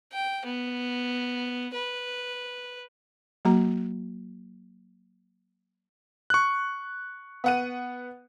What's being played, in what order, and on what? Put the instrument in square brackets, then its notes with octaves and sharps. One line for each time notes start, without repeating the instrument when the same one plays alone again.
[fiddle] G5
B3
B4
[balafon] F#3 A#3 F#4 A#5
[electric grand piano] C#6 F#6
[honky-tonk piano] B3 F#5 D#7